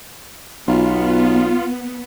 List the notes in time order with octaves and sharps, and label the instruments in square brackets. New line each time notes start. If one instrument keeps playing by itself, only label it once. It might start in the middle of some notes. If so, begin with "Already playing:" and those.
[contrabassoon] B1 [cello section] B3 [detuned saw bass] F4